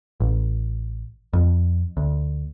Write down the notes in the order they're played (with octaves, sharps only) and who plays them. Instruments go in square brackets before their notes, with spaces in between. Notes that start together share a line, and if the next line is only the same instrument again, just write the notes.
[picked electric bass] A1
F2
D2